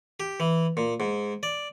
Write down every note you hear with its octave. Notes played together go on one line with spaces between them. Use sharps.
G4
E3
A#2
G#2
D5